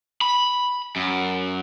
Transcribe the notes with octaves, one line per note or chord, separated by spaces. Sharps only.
B5
F#2